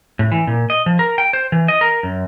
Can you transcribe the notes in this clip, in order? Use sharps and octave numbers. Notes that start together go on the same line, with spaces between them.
A2
E3
A#2
D#5
F3
A#4
G5
C5
E3
D#5
A#4
F#2